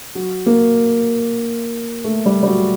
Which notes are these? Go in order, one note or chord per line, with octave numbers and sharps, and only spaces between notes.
F#3
A#3
A3
G3
G3
F#3